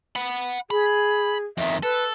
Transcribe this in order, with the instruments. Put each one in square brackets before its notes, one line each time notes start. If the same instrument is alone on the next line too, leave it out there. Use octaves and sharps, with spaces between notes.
[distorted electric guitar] F#5 B5
[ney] G#4 [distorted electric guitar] B5
[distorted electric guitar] F2 D#3 [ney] E5
[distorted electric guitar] A4 [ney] B4